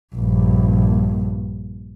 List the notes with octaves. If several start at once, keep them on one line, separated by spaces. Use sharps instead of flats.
A#1 G2